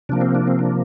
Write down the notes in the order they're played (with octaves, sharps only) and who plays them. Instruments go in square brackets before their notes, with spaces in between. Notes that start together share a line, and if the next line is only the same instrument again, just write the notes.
[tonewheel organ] C3 F3 A#3 D4
C4
D4
C4
D4